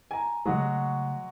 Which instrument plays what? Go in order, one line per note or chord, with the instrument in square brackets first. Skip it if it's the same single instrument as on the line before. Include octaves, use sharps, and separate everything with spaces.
[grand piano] G#5 A#5
[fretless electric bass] C#3 F3 A3 [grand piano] F#3 G#3 F#4